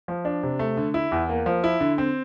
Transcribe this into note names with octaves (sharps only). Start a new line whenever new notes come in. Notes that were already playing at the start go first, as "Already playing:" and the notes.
F3
D4
C3
A3
D3
E4
E2
A#3
F3
E4
D3
C4